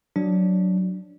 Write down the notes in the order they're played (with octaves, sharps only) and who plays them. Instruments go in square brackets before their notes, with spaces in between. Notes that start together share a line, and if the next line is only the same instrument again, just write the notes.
[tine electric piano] F#3 D4